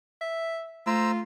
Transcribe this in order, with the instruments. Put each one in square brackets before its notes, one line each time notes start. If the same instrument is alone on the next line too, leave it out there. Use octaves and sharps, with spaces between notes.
[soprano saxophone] E5
[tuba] A3 [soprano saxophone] F4 [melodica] C5 A#5 E6